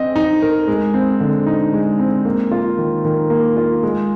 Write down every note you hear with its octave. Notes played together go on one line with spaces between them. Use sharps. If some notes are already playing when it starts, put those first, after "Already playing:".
Already playing: C4 D#5
D#4
A#4
G#3
C4
D3
D#4
G#3
C4
A#3
F4
D#3
D#3
A#3
F4
G#3